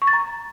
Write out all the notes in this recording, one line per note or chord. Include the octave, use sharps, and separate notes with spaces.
C#6
A6
A#5